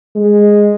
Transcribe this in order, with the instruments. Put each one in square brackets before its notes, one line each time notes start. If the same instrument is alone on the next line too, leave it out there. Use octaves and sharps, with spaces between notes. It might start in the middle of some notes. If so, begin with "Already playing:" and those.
[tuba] G#3